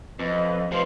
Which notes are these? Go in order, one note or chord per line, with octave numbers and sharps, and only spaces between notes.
F2 B4 D#5
C3 F3 B4 F5 C6